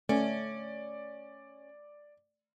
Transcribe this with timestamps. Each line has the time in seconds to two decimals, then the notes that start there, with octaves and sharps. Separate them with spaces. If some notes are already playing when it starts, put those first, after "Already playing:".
0.09 A3 C#4 D5